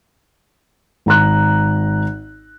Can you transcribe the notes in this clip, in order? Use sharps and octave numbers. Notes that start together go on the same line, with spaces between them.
G#1 A#5 F#6